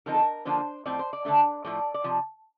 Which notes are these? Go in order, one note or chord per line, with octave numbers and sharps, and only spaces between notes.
D3 F3 C4 D#4 A#4
A4
A#4
D3 F3 A#3 D4 C5
A2 F3 C4 D5
C5
D5
D3 A3 D4
A2 F3 A3 D5
D5
C3 F3